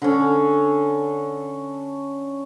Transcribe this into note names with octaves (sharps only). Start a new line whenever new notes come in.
D3 C#4